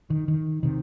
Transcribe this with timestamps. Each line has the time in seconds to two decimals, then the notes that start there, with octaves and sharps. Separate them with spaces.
0.10 D#3
0.28 D#3
0.63 C3 D#3